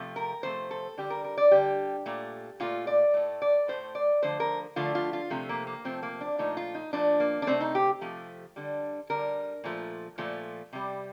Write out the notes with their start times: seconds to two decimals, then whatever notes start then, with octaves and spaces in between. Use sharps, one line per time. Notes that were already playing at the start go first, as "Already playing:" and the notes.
Already playing: C3 F3 A3
0.16 A#4
0.43 C3 F3 A3 C5
0.71 A4
0.97 D3 G3 G4
1.10 A#4
1.24 A#4
1.37 D5
1.51 D3 G3 G4
2.06 A#2 A3
2.60 A#2 A3 F4
2.87 D5
3.14 A2 A3
3.42 D5
3.68 A2 A3 C5
3.95 D5
4.22 D3 F3 A3 C5
4.40 A#4
4.76 D3 F3 A3 F4
4.95 F4
5.13 F4
5.30 C3 F3 A3
5.49 A#3
5.67 A#3
5.85 C3 F3 A3 C4
6.03 A#3
6.21 D4
6.38 A#2 F3 A3 D#4
6.57 F4
6.75 D#4
6.93 A#2 F3 A3 D4
7.20 A#3
7.42 D4
7.47 C3 F3 A3 C4
7.61 D#4
7.75 G4
8.01 C3 F3 A3
8.56 D3 G3
9.10 D3 G3 A#4
9.64 A#2 F3 A3
10.18 A#2 F3 A3
10.73 C3 G3